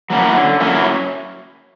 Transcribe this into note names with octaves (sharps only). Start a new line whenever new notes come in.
F#3 A#3 C#4 E4
D3
F#3 A#3 C#4 E4